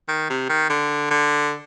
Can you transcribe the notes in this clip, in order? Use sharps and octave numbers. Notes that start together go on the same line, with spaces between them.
D#3
C3
D#3
D3
D3